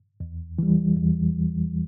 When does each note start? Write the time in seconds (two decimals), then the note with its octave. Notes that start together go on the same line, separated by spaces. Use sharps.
0.20 E2
0.59 E3 G3
0.96 E2